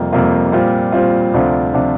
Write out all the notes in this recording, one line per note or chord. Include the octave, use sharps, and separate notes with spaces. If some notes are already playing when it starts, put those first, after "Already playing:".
Already playing: F2 C3 G3 A#3 F4
F2 C3 G3 A#3 F4
A#2 G3 C4 F4
A#2 G3 C4 F4
D2 C3 F3 D4 F4
C3 F3 D4 F4